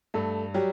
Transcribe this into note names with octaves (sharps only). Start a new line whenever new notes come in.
G2 A3 A4
F#3 G3 G4